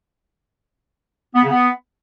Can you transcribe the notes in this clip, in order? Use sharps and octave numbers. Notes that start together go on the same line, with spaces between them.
B3
C#3
B3